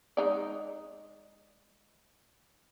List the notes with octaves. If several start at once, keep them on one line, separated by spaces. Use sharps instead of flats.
G#3 D#4 D5